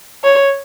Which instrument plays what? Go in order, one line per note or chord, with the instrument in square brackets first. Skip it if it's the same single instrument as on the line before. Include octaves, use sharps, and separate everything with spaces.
[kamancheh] C#5